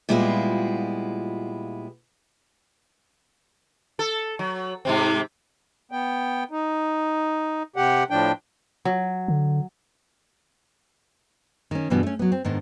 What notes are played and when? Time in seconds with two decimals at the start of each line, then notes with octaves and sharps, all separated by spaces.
0.09 A#2 G3 G#3 B3 E4 F4
3.99 A4
4.39 F#3
4.85 G#2 C3 C4
5.91 B3 G5
6.51 D#4
7.76 C3 G4 F#5
8.10 A2 F3 D4 G5
8.85 F#3
9.28 D3
11.71 D#3 C#4
11.90 G2 B2 E3 G3 B3
12.03 A3 C#4
12.19 F#3 B3
12.32 C4
12.45 G#2 D#3 B3 D4